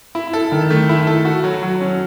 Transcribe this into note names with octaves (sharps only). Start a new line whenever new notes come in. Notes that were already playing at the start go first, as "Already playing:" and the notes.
E4
A4
D#3
A3
E4
A4
F#4
F#3
F#3
C#4